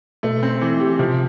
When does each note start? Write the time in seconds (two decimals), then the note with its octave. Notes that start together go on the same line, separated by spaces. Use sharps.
0.23 B2 A3
0.43 C4
0.61 E3
0.80 G4
0.99 C3 F3